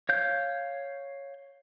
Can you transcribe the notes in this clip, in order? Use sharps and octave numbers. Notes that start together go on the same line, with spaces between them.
C#5 F5 G6